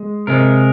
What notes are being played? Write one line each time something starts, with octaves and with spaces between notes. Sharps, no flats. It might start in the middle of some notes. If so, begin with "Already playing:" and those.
Already playing: G#3
C3 G#3 A#4